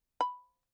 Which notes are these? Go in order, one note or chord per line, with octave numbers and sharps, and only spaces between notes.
B5